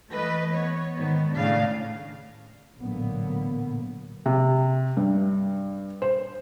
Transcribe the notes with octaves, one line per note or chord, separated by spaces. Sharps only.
E3 A3 B4 D#5
B3 C#5
G#2 D#3 B3
A2 C#3 D4 F5
A1 A#2 D3 F#3 A#3 B3
C3
G2
C5